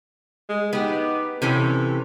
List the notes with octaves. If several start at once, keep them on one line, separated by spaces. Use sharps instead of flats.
G#3
B3 D#4 G4
C3 E3 C#4 A4